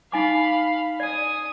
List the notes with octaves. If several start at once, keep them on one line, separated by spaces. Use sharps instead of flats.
D#4 F5 G#5 B5 D6
D5 G#5 D#6